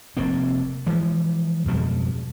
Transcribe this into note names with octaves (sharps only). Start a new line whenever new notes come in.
F1 F2 A#3 C4
E3 F3 G#3
F2 B2 G3 G#3